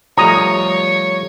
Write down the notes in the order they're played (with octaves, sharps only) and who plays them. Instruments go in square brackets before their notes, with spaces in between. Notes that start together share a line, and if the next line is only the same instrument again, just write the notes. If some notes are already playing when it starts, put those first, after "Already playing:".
[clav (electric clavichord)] F3 G3 A3 [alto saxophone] C#5 [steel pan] A#5 D#6